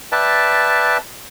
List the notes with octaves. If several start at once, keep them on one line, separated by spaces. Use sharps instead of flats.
B4 D5 E5 G5 A5